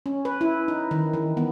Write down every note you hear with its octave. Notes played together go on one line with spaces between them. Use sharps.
C#4
B4
E4
D#4
D#3
E3
B3